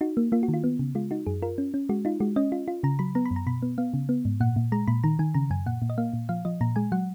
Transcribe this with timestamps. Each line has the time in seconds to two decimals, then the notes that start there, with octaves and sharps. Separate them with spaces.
0.01 D#4 F#4
0.17 A#3
0.32 A#3 F4
0.43 F#4
0.48 D#3
0.54 F4
0.64 B3
0.79 C#3
0.95 G#3 F4
1.11 D#4 F#4
1.26 F#2 G#4
1.42 F4 A#4
1.58 C#4
1.74 C#4
1.89 G#3 F#4
2.05 D#4 F4
2.20 G#3 F#4
2.36 C#4 D#5
2.52 F4
2.68 F4
2.83 C#3 A#5
2.99 F#3 B5
3.15 B3 A#5
3.26 B5
3.31 F#2
3.36 A#5
3.47 B2 B5
3.62 B3
3.78 B3 F5
3.94 C#3
4.09 B3
4.25 G#2
4.40 A#2 F#5
4.56 A#2
4.72 G#3 A#5
4.88 A#2 B5
5.04 D#3 A#5
5.19 D#3 G#5
5.34 C#3 A#5
5.50 F#2 G#5
5.66 A#2 F#5
5.82 A#2
5.90 D#5
5.98 A#3 F5
6.13 A#2
6.29 F3 F5
6.45 F3 D#5
6.61 A#2 A#5
6.76 G#3 G#5
6.92 F#3 F#5